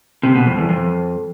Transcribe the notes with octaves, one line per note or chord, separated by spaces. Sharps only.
C3
B2
F2
E2
F2